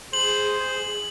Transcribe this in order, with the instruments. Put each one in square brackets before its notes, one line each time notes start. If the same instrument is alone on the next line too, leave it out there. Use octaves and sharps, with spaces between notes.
[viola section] G#4 [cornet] C5 [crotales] F#7